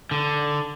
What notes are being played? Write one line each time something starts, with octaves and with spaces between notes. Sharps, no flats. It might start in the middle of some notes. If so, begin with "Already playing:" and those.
D3